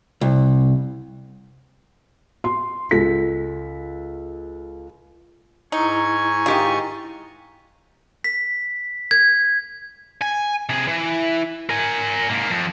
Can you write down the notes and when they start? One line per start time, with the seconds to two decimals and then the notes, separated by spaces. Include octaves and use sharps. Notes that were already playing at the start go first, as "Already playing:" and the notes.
0.21 C2
2.44 C6
2.91 C#2 A4 B6
5.72 G#2 D#4 E4 G#5 A#5 C#6
6.46 D#3 F4 G4 D#5
8.24 B6
9.11 G#6
10.21 G#5
10.69 C3 G#4
10.88 E3
11.69 A#4 G#5
12.30 G#2 A#3
12.51 F2